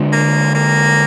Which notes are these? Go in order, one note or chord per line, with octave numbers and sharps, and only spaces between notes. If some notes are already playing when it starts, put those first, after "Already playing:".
Already playing: D3 G#3 D4
A#3
A#3